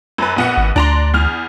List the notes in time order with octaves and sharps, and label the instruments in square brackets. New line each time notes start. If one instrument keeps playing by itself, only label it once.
[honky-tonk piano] F#2 B4
A#1 B3 F#5
[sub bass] G#1
[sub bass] D2 [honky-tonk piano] D4 A#5 C6
[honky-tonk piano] E2 F6